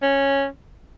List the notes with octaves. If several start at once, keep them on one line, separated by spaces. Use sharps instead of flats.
C#4